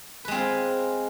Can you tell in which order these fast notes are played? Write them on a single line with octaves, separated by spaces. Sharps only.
B4 G#3 C4 F4